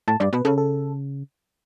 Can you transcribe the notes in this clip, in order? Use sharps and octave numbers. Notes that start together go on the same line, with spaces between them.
A2 A5
G2 D5
B2 B4
C#3 A4
A4